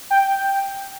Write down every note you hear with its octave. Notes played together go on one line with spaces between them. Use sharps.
G5